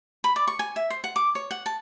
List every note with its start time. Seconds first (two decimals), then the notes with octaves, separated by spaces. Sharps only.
0.24 B5
0.36 D5
0.48 C#6
0.59 G#5
0.76 E5
0.90 C5
1.04 F#5
1.16 D6
1.35 C#5
1.51 F#5
1.66 A5